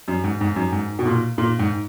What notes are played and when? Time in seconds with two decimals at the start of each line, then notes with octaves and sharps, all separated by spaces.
0.08 F#2
0.24 G#2
0.41 G#2
0.56 F#2
0.72 G#2
0.99 B2
1.05 A#2
1.38 A#2
1.59 G#2